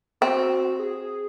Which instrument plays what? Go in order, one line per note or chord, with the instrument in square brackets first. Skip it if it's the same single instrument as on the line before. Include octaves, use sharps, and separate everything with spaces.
[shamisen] C4 [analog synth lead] F#4
[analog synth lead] G#4